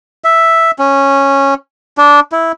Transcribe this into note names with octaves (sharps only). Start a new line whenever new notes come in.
E5
C#4
D4
E4